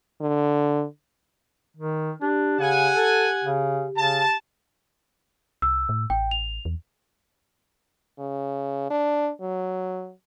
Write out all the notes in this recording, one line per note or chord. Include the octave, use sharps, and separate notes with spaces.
D3
D#3
D4 G4
C#3 F#5 G#5
A4
C#3
C#3 A5
C2 E6
A2
A1 G5
F7
E2
C#3
D4
F#3